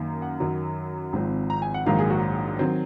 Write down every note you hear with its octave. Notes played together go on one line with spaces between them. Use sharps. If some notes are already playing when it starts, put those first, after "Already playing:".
Already playing: F#2 D#3 A#3
F#5
F#2 D#3 F#3
G#1 G#2 F3 C4
A#5
G#5
F#5
A#1 G#2 D#3 F#3 A#3 F5
G#4
F#4
D#3 F#3 C4